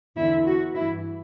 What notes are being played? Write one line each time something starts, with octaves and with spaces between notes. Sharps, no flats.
E2 D3 E4
F#4
G2 E3 E4